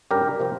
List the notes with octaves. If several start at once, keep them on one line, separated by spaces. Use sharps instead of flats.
G2 G3 C#4 G4 A#4
C3 F3 C4